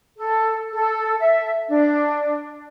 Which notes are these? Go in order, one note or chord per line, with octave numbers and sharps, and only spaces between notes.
A4
A4
E5
D4